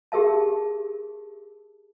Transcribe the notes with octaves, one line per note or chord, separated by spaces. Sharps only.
G4 G#4 A#4 E5 A5